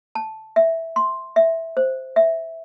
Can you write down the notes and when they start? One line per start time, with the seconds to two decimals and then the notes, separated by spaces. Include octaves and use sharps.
0.15 A5
0.56 E5
0.96 C6
1.36 E5
1.77 C5
2.16 E5